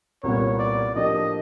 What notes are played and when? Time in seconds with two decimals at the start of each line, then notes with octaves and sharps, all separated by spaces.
0.23 C2 A#2 G3 B3 C#5
0.59 D5
0.95 A2 F3 A#3 D4 G4 D#5